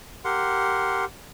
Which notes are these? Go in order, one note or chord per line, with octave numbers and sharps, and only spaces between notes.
G4 A#4 F#5 C6